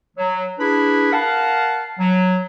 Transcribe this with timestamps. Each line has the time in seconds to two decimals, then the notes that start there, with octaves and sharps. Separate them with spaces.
0.17 F#3
0.59 D4 E4 G#4 B4 B5
1.12 A#4 F5 F#5 A5
1.99 F#3